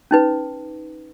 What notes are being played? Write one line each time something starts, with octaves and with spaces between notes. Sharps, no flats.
C#4 D#4 B4